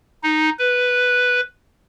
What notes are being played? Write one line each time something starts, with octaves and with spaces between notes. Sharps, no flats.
D#4
B4